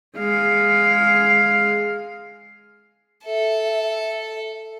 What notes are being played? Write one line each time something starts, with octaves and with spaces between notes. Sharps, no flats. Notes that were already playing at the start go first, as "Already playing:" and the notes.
G#3 F5
A4 E5